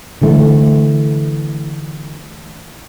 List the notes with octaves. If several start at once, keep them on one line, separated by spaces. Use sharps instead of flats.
D3 E3 A3